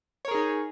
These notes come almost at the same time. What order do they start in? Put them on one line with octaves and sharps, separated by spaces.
C#5 A#4 G#4 D#4